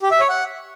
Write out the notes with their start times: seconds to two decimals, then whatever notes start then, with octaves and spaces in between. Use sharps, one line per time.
0.02 G4
0.11 E5
0.20 C#5
0.29 F#5